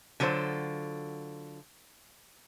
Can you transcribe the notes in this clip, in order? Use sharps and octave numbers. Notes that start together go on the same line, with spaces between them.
D3 F#3 F4 A4 C5